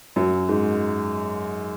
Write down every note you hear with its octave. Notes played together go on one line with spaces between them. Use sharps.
F#2 F#3
G#2 G#3